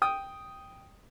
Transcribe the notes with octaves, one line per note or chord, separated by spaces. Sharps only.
G5 D#6